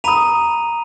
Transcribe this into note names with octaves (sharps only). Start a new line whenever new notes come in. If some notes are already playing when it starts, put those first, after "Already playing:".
A#5 B5 D#6 D#7 F7